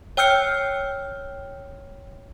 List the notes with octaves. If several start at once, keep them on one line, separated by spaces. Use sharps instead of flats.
C#5 G5 E6 F6 G6 C#7